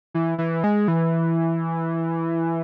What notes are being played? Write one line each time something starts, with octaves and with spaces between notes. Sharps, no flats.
E3
E3
G#3
E3